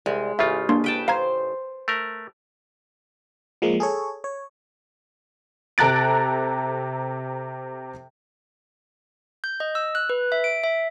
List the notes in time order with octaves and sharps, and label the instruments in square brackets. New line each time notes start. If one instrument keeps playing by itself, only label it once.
[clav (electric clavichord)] C2 [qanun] G#3
[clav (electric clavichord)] A1 C#3 F4 [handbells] E5
[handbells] A#3 D4 C6
[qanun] B4 G5 A5
[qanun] C5 [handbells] F5 A#5 G#6
[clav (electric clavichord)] A3 A#4
[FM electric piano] F3 G#3 A#3
G#4 A4 C#5
C#5
[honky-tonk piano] C3 A4 A#5 F#6 A6 D7
[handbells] G6
D#5
E6
F#6
B4
E5
D7
E5